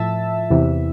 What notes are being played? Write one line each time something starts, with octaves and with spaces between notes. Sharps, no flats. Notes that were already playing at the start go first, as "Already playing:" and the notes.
Already playing: A2 F3 E5 A5
E2 C3 E3